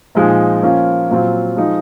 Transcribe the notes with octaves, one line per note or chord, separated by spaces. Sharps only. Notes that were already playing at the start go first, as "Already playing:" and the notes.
A#2 F3 G#3 D#4
F3 A#3 C#4 F4
A#2 F#3 C4 F4
F3 G#3 D#4